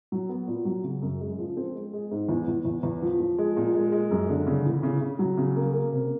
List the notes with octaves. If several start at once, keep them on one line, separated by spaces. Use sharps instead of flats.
F#3
B3
A#2
F#3
C#3
F#2
G#3
F3
C4
G#3
G#3
G#2
E2
E2
E2
E2
F3
F3
G#3
A#2
G#3
G#3
F#2
D3
C#3
E3
C#3
C#3
F#3
C#3
A#3
A#3
C3